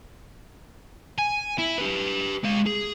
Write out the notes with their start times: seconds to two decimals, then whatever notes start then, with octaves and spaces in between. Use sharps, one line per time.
1.18 G#5
1.58 E4
1.78 G4 B4
2.44 G#3 F5
2.66 G#4